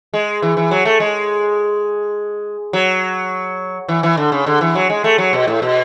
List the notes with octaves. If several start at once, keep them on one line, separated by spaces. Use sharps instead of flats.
G#3
E3
E3
F#3
A3
G#3
F#3
E3
E3
D3
C#3
D3
E3
F#3
G#3
A3
F#3
B2
A2
B2